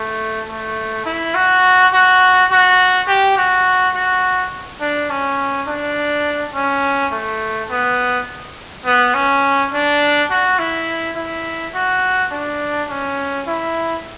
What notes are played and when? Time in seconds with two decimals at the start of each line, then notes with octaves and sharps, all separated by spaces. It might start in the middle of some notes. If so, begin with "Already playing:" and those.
Already playing: A3
0.49 A3
1.06 E4
1.35 F#4
1.93 F#4
2.50 F#4
3.08 G4
3.37 F#4
3.95 F#4
4.81 D4
5.10 C#4
5.67 D4
6.54 C#4
7.12 A3
7.70 B3
8.86 B3
9.14 C#4
9.72 D4
10.30 F#4
10.59 E4
11.16 E4
11.74 F#4
12.31 D4
12.89 C#4
13.47 E4